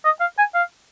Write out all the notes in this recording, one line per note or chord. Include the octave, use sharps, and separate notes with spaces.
D#5
F5
G#5
F5